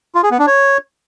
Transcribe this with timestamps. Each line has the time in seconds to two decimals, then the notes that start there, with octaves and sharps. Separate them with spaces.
0.15 F4
0.23 G#4
0.31 B3
0.39 D4
0.47 C#5